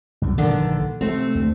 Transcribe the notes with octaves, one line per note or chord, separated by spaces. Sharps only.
C2 F#2 G3
A#1 G2 D3 D#3 D4
C3 A3 C4
D2